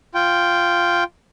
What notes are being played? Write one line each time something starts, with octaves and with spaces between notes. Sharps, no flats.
F4 G5